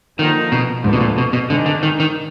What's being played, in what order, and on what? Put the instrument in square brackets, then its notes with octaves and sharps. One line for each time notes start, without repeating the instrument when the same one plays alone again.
[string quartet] D3 F3 A#3 D#4 [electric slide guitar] D#3
[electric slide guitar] B2
[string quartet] D2 D3 F3 B3 D4 [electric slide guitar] G#2
[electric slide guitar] B2
A#2
B2
B2
[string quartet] G#2 D#3 G#3 D4 [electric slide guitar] D3
[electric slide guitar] D3
D#3
D#3